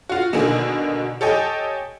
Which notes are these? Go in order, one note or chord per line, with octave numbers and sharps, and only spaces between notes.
F4 F#4
B2 D3 D#3 A#3 G#4
G4 A4 C#5 D#5 G5 G#5